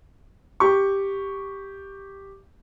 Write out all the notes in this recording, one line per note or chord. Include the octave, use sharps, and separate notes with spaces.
G4 C#6